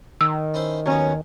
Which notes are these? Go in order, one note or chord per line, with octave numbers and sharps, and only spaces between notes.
D#3 E6
C#4 E4 C5
D#2 F#3 B3 C#4